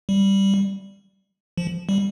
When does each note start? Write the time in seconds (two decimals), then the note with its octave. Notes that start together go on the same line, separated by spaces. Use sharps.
0.09 G3
1.58 F3
1.89 G3